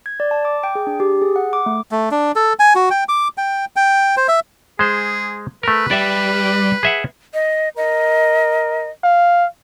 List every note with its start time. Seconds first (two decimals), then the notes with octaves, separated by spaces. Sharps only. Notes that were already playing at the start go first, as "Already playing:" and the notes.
0.06 G#6
0.20 D5
0.31 A5
0.45 D6
0.63 G5
0.75 G#4
0.87 D4
1.00 G4
1.22 G#4
1.36 F#5
1.53 D6
1.66 A3
1.91 A3
2.11 D4
2.36 A4
2.59 G#5
2.75 F#4
2.91 G5
3.09 D6
3.38 G5
3.76 G5
4.17 C5
4.28 E5
4.79 G#3 G#4 C5
5.63 A3 A#4 B4
5.91 G3 D5 E5
6.83 G#4 E5 F#5
7.34 D#5
7.77 A#4 D#5
9.04 F5